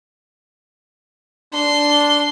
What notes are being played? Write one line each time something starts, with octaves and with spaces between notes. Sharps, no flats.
D4 C6